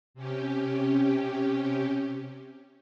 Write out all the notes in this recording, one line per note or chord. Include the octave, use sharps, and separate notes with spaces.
C3 C#4 G4